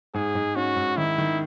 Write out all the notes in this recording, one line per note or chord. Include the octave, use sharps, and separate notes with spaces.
G#2 G#4
G#2
C#4 F#4
G#2
D#3 E4
D#3